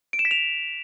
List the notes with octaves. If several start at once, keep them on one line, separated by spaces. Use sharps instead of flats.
D7
E7
B6
F7